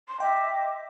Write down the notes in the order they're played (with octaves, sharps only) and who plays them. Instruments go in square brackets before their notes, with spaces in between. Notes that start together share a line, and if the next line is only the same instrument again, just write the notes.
[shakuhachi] C6
[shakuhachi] D#5 [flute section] E5 D6 [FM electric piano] G5